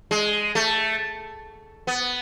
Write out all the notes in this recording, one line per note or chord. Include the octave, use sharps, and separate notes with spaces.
G#3
A3
B3